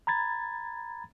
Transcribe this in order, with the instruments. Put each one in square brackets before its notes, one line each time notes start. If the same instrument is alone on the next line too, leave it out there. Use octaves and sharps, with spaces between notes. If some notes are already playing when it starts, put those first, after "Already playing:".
[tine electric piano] A#5 B5 G#6 A6